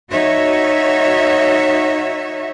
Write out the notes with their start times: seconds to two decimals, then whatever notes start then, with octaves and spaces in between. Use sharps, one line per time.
0.10 D#4 F#4 C#5 E5